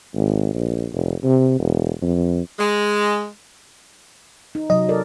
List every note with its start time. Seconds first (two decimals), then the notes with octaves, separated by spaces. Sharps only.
0.15 G#1
0.54 A#1
0.93 F1
1.24 C3
1.60 E1
2.02 F2
2.58 G#3
4.55 D#4
4.70 C3 F#3 D#5
4.89 A4 A#4 D5